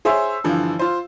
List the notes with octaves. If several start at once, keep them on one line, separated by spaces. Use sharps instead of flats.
G#4 C5 C#5 E5 E6
G2 D3 E3 F3
F4 C5